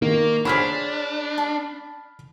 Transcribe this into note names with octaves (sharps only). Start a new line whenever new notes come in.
D#3 A#3
D4 G#4 C5 C#5 B5 F6 B6
A5